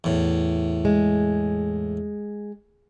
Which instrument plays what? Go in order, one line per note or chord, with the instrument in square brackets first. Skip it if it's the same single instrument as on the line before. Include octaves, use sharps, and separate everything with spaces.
[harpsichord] E2 A2
[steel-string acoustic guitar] G#3